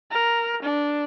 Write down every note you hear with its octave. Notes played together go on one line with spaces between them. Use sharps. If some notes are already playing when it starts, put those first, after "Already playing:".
A#4
D4